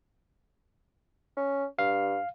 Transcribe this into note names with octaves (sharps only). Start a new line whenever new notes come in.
C#4
G2 F5